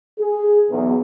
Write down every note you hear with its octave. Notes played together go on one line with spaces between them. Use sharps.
G#4
B1 E2